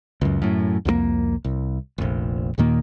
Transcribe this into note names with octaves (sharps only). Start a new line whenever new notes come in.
C#2 F#2
F#2 A2
C2 F2 F3 A#3
C2
F1 A#1
D#2 A#2 D#3 A#3